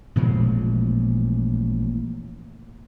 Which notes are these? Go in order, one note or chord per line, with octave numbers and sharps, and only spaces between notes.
A1 A#2 F3 G#3